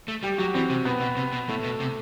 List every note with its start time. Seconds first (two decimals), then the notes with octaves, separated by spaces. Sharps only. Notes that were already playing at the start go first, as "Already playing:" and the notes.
0.08 A3
0.23 G3 G4
0.38 F#3 F#4
0.54 E3 C4
0.70 C3
0.85 B2 B3
1.01 B2
1.17 C3
1.33 B2
1.49 A2 A3
1.64 B2
1.80 C3